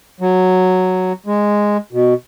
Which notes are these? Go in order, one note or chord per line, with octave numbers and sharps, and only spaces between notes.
F#3
G#3
B2